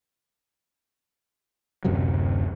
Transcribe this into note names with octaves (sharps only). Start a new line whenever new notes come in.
D1 F#2 C3 F#3